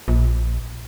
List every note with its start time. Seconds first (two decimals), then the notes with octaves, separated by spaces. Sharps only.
0.08 A#1